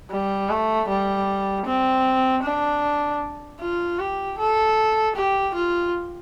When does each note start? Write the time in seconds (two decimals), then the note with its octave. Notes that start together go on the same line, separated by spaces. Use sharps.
0.11 G3
0.49 A3
0.88 G3
1.66 C4
2.44 D4
3.60 F4
3.99 G4
4.38 A4
5.16 G4
5.55 F4